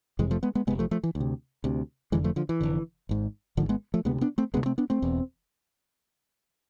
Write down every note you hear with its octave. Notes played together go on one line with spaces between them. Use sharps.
F1 F2 C3 E3 G#3
F3 A3
G#3 B3
G#3 B3
F1 F2 C3 G#3 B3
F3 A3
F3 A3
E3
D2
C3
D2 C3
F1 F2 D3 E3 G#3
F3 A3
D3 F3
E3
F1 F2 D3
G#1 G#2
G#1 G#2 D3 F3
G#3 B3
F3 A3
D2 C3 G#3 B3
B3 D4
A3 C4
D2 C3 G#3 B3
A3 C4
B3 D4
A3 C4
E1 E2 B2